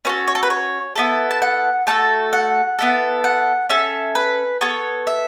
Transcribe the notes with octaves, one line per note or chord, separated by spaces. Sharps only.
C#4 F#4 A4 B4
C#5
A4
B4
C#5
B3 E4 A4
A5
F#5
A3 F#4 A4 A5
F#5
B3 E4 A4
F#5
C#4 A4 E5
B4
B3 A4 C#5
E5